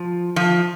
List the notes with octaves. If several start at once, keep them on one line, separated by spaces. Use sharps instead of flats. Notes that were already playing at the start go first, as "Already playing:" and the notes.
Already playing: F3
F3